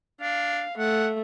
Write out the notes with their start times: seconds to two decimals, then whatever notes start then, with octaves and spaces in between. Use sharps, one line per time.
0.21 D4 F5
0.77 A3 F#5